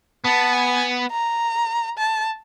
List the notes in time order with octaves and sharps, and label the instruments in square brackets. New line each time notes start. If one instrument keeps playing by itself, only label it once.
[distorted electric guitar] B3 [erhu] A5
[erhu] G#5
A#5
A5